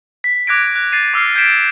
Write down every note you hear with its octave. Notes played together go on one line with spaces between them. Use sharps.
B6
D6 F#6 G#6 A#6 D7
F#6
F#6 A6 C7 D#7
D6 E6 F6 C7
G6 G#6 B6 C7 D7 E7